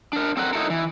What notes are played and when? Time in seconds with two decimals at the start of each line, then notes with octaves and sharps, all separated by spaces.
0.13 D4 A#4
0.37 C4 A4 A#4 F#5
0.53 D#4 E4 F#4 A4 A#4
0.70 E3